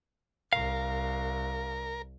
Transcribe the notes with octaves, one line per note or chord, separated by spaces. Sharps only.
C2 A#4 F5